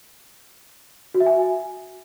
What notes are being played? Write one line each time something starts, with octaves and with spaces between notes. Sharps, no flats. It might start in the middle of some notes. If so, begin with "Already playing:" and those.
F#4
E5
G#5